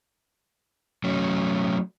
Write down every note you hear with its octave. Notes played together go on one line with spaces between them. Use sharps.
F#3 A3 C#4